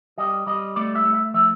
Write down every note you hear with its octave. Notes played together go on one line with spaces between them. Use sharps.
G3 D#5
G3 D#5
A3 D5
E5
A3
E5
F3 E5